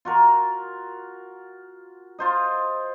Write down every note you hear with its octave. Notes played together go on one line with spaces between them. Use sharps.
F4 F#4 A#4
F4 C5 D#5